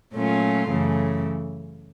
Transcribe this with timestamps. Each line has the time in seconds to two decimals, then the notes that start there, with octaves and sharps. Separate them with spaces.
0.13 A#2 F#3 A3 C#4 F4
0.68 F#2 C#3 E3 A3